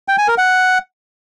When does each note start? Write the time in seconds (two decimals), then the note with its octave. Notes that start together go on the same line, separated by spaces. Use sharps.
0.08 G5
0.18 G#5
0.28 A#4
0.38 F#5